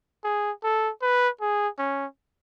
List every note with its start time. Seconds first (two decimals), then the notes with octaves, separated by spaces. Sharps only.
0.24 G#4
0.64 A4
1.02 B4
1.41 G#4
1.79 C#4